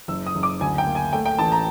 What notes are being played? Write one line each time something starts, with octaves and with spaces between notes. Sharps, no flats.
F#1 E6
D#6
F#1
D6
D2 G#5
G5
A#3
G#5
A3 G5
G5
A1 A5
A#5